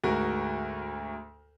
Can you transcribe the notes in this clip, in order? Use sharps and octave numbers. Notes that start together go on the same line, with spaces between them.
D2 G#2 F#4 A#4